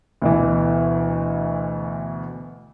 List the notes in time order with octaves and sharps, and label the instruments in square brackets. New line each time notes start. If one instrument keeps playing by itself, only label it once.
[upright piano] D2 B2 E3